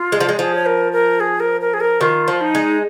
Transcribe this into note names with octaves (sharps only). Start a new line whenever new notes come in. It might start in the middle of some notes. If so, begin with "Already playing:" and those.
Already playing: F4
G#3
F3
G#3
F3 G#4
C#5
A#4
A#4
G#4
A#4
A#4
G#4
A#4
D#3 F4
F3
D#4
G#3